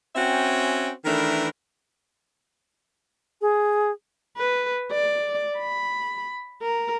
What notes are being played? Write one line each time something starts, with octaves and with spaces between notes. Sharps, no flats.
C4 C#4 F#4 E5 G5 G#5
D#3 E3 A3 D4 A#4 B4
G#4
B4
D5
B5
A#4